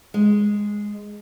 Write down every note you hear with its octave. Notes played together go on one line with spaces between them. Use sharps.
G#3